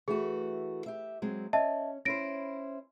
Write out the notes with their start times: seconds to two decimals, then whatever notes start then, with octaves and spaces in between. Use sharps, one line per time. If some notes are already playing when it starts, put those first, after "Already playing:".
0.08 E3 A3 F#4 G#4
0.86 G4 E5
1.22 F#3 G#3 C4
1.53 C#4 D#5 E5 A5
2.05 C#4 E4 C5 A#6 D7